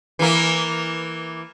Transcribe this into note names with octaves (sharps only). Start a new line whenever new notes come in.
E3 A#3